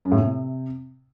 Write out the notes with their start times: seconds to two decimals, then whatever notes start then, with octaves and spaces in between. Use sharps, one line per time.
0.05 F#2
0.12 A2
0.18 C3